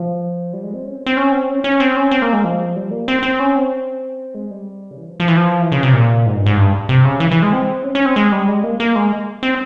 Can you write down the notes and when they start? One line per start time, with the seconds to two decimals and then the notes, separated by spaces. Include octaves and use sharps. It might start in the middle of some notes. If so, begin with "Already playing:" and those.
Already playing: F3
0.53 G3
0.63 G#3
0.74 C4
0.85 C#4
0.95 C4
1.06 C4
1.17 C#4
1.32 C4
1.49 C#4
1.64 C#4
1.80 C4
1.96 C#4
2.11 C4
2.22 A#3
2.33 G#3
2.44 F3
2.76 G3
2.91 A#3
3.08 C4
3.23 C4
3.40 C#4
3.56 C4
4.35 G#3
4.51 G3
4.91 C#3
4.98 E3
5.09 F3
5.20 F3
5.28 E3
5.37 F3
5.62 E3
5.72 C#3
5.83 C3
5.93 A#2
6.26 G#2
6.36 G2
6.46 G#2
6.57 G2
6.89 C3
7.04 C#3
7.20 E3
7.31 E3
7.43 G#3
7.53 C4
7.84 C#4
7.95 C#4
8.05 C4
8.16 G#3
8.32 G3
8.48 G#3
8.63 A#3
8.80 A#3
8.96 G#3
9.43 C4